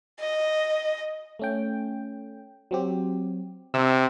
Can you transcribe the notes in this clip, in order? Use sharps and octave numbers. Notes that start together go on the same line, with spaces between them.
D#5
A3 C#4 G5
F#3 C4 G4
C3 E6